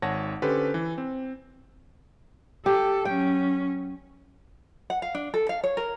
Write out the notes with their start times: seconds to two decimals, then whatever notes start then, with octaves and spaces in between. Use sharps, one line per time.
0.02 G#1 C#5 F#5 A5 A#6
0.42 D3 C#4 G4 A4 B4 C5
0.74 E3
0.98 C4
2.66 G4 A4
3.05 F#3 C#4 G5
4.90 F#5
5.02 F5
5.15 D4
5.34 A4
5.49 F5
5.64 C#5
5.77 A#4